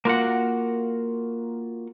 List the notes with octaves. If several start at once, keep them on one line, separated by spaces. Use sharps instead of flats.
A#3 F4 F#4 F#5